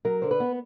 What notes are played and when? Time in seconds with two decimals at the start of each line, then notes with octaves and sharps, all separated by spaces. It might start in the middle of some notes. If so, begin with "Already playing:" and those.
0.05 F#3 A#4
0.22 D3 C5
0.31 B4
0.40 B3